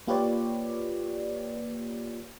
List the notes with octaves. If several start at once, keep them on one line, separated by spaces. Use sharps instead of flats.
A#3 F4 G4 B4 C#5 D5